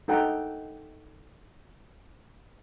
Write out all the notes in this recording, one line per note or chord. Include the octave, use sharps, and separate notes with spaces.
D#4 A4 F#5 G5 A#5